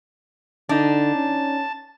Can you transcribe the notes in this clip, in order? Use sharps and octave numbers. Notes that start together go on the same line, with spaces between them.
D3 D4 D#4 A5
C#4